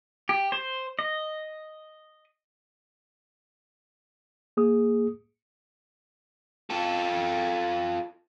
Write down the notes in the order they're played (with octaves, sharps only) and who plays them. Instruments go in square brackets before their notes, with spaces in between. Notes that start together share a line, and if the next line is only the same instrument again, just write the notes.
[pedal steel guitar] G4
C5
D#5
[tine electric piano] A#3 G#4 D#6
[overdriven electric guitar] F4 A4